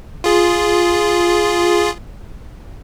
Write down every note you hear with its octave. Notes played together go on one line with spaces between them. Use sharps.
F4 G#4